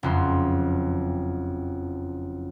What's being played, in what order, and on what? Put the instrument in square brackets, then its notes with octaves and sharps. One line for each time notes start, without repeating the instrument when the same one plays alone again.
[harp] F#1 F2 C6